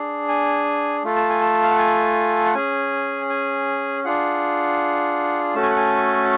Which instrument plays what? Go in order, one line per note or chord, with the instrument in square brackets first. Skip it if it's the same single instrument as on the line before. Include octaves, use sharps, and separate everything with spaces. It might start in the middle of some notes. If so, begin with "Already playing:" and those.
Already playing: [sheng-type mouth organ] D4 G#4
G#5
A3 F4 A4
A5
G#5
A5
F5
F#5
G#5
F#5
C#4 G#4 G#5
G#5
D4 F4 G#4 F#5
A3 C#4 F#4 A4 A5
G#5
F#5
G#5